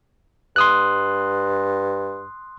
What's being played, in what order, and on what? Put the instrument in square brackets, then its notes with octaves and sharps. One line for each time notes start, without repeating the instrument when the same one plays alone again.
[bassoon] G2 [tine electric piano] C6 D#6 F#6